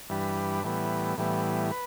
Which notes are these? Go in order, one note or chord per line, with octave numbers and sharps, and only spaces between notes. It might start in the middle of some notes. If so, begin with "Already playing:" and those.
G2 E3 G3 D4 B4
A2 E3 G3 B3
A2 E3 G3 B3
B4